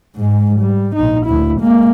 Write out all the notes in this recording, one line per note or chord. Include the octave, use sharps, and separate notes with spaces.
G#2 G#3
G3
A#1 D#4
D2 E4
G#3 A#3